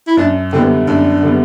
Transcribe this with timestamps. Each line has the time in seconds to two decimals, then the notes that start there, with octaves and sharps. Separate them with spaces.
0.07 E4
0.17 F#2 D4
0.53 D3 G3 B3 C4
0.87 F#2 D4
1.23 D3 G3 B3